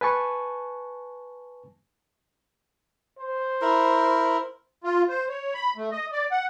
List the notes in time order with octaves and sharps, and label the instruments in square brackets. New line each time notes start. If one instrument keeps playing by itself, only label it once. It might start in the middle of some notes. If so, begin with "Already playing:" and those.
[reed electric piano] B4 G#5 A5 C#6
[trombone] C5
[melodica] E4 A#4
[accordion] F4
C5
C#5
B5
A3
D#5
D5
F#5